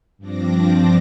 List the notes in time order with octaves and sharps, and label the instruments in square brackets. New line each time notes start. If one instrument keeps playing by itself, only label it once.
[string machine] G2 F3 C4 D4 D6 A#6